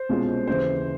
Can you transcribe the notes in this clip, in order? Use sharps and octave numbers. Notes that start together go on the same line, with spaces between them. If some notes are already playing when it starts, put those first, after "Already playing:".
Already playing: C5
C2 B2 G#3 C#4 F4
D#2 C#3 E3 C5